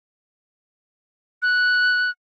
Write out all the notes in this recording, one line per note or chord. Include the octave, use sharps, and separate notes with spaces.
F#6